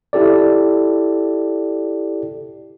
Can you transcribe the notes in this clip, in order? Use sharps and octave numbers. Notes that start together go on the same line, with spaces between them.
E4 G4 A4 D5